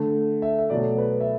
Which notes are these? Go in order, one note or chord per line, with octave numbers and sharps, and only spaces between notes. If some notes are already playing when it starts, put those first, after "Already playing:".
Already playing: D3 A3
E5
E5
B2 F#3 A3 D5
B4
E5